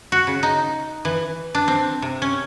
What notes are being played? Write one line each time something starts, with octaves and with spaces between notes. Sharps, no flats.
F#4
C#3
D#4
E3
D4
C4
C3
C#4